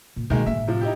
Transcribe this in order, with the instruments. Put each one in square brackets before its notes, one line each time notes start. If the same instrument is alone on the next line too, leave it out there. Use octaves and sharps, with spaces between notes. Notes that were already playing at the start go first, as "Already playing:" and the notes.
[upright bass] A#2
[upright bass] B2 B3 [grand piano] D#3 G#3 A#3
[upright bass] G1 A2 [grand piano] E5
[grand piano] C3 F3
D#4 E4 G4